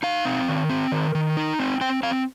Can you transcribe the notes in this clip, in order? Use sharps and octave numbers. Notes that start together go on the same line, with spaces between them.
D#4 F5
C4
D#3
C4
D#3
D#3
D#4
C4
C4 G5
C4 F5